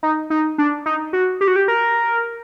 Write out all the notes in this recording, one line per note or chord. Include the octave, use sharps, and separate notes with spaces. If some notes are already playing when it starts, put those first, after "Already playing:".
D#4
D#4
D4
D#4
F#4
G4
F#4
G4
A#4